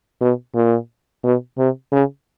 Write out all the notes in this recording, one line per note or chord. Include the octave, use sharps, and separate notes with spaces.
B2
A#2
B2
C3
C#3